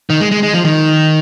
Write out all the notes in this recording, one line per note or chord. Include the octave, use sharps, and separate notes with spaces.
D#3
G#3
G#3
G#3
F3
D#3